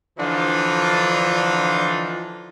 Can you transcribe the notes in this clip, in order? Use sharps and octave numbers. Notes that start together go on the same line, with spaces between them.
D3 E3 F3 D4 D#4 F4